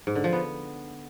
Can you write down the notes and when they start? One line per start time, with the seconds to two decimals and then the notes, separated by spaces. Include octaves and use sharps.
0.07 G#2
0.15 D3
0.24 F3
0.33 B3